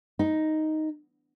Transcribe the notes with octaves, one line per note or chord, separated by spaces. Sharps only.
D#4